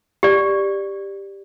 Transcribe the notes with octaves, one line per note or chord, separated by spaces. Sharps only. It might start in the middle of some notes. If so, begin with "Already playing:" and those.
G4 D5